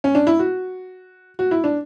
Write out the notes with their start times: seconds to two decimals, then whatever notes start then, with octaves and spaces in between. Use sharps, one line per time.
0.04 C#4
0.15 D4
0.27 E4
0.39 F#4
1.39 F#4
1.51 E4
1.64 D4